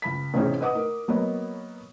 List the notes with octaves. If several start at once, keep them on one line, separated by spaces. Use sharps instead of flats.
C#2 B5 B6
A1 C3 C4 C#4 D#4 G#4
B4 D#5 F#5 D6 D#6
D#4 A#4
F#3 A#3 B3 A#4 C#5 D#5